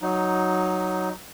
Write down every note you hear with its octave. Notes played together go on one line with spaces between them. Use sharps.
F#3 D#4